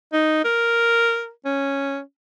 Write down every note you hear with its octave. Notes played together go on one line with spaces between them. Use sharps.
D#4
A#4
C#4